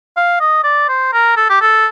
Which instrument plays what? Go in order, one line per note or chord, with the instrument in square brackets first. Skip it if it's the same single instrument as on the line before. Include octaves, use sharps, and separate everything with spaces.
[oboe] F5
D#5
D5
C5
A#4
A4
G4
A4